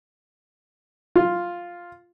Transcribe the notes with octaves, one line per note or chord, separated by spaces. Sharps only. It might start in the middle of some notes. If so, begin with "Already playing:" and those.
F4